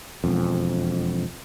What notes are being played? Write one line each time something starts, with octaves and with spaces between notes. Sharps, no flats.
E1 F2